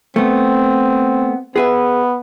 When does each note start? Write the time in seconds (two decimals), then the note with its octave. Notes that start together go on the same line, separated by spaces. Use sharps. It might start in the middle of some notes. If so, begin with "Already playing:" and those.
0.16 A3 B3 C4
1.56 B3 G#4 B4 E5